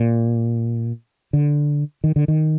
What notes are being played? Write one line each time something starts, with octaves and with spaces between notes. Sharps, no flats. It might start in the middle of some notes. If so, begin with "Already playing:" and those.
Already playing: A#2
D3
D#3
D3
D#3